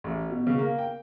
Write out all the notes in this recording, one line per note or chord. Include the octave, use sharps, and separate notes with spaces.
A1
B2
C#3
A#3
G5